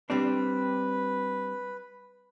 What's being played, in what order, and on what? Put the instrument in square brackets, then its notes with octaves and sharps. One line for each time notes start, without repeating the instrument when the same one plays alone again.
[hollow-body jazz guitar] G3 C4 D4 [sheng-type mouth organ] B4